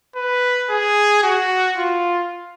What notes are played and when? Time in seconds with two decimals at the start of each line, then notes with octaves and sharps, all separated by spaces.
0.16 B4
0.70 G#4
1.23 F#4
1.77 F4